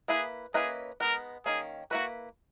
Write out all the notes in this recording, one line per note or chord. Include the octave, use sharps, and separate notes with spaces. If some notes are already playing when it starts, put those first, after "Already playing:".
A#3 E4 G#4 B4
A#3 C#4 E4 G#4 B4 D#5
G#3 B3 D#4 A#4
D#3 A#3 C#4 G#4
A#3 E4 F#4 B4